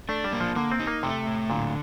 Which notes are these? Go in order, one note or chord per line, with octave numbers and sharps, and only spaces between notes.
A3 D4
G3
A#3
F3
D3 A#3
C4
D#4
A#3
C3 A3
A2
A#2 D3